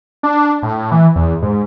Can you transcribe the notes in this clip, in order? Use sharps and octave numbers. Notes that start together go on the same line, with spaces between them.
D4
A2
E3
E2
G#2